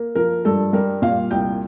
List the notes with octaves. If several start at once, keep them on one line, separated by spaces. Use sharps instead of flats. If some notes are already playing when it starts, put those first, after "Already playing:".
Already playing: A#3
F3 A#4
G2 A4
G3 A#4
A#2 F5
C2 G5